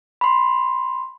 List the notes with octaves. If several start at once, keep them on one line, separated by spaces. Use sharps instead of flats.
B5 C6